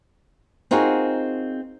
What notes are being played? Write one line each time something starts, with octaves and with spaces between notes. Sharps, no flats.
C4 D#4 F4 F#4 G#4 A#4